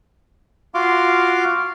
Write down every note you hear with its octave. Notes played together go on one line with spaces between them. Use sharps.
F4 F#4 F5 C6 D6